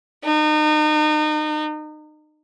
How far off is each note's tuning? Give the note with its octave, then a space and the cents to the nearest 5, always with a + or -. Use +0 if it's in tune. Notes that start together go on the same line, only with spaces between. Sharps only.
D#4 -35